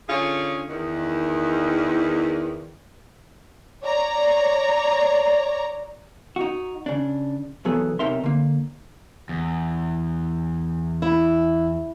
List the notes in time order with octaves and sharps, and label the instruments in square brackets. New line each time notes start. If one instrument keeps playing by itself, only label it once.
[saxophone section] D3 C#4 F4 G#4
E2 D#3
[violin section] C#5 D5 A#5
[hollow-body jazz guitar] D#4 F#4
C#3 D4
B1 E2 F#3 B3 G#4 A4
B1 C3 D#4 A#4 E5 C6
D3 A#3
[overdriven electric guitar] E2
[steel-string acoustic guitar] E4